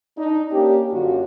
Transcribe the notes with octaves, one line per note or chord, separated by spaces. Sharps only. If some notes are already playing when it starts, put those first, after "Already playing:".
D4 D#4
A#3 C#4 D4 G4
F#2 D3 F4 F#4